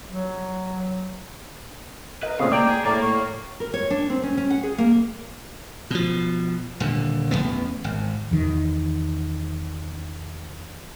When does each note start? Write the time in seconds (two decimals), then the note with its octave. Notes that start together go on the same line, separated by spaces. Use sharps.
0.07 F#3
2.23 A#4 B4 D#5
2.40 A#2 C#3 A3 C4 F5 D#6
2.52 A#3 D5 G5 A#5
2.68 G#4
2.84 A2 A3 A#3 D5 A#5 D6
3.01 A2 C#6
3.60 A#4
3.74 C#5
3.90 D4
4.10 C4
4.23 C#4
4.37 C#4
4.51 F#5
4.63 G#4
4.78 A#3
5.90 B2 F3
6.80 D#1 D3
7.31 A1 E2 G#2 B3
7.84 G#1
8.31 E2 D#3